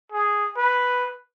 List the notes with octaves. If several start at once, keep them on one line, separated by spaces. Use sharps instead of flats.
G#4
B4